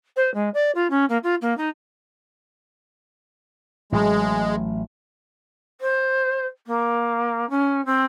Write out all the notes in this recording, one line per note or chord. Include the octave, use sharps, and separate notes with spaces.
C5
G#3
D5
F4
C#4
A#3
F4
A#3
D#4
A1 A2 F#3 G#3
C5
A#3
C#4
C4